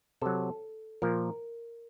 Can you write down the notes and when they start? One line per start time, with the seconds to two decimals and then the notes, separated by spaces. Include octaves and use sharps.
0.22 C3 F#3 A4
1.02 A#2 F3 A#4